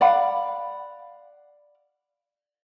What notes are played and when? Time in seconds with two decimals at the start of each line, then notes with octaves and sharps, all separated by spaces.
0.01 D5 F5 F#5 B5